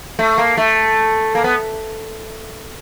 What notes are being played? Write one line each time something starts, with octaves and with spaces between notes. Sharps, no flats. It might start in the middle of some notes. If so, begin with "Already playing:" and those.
A3
A#3
A3
A#3
B3